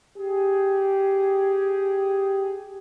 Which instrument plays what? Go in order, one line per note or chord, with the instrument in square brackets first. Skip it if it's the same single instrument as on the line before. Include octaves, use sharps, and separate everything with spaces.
[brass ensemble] G4 G#4